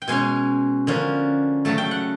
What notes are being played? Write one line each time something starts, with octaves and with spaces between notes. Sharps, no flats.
G5
B2 G#3 C#4 G#5
D3 F3 A#3 C#4
C#3 F#3 A3 A5
G5
F#5